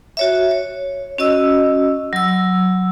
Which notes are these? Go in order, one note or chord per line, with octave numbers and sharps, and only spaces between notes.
F#4 C#5 E5
C#5
C#4 F#4 D#5 E6
F#3 E6